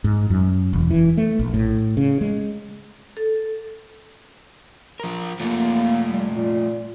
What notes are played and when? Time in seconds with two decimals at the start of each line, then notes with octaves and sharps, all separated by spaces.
0.04 G#2
0.30 F#2
0.73 E1
0.90 E3
1.17 A3
1.39 A#1
1.54 A2
1.97 C#3
2.21 G#3
3.17 A4
5.00 F3 A#4
5.40 F3 A3 A#3 F4
6.10 G3
6.33 A#2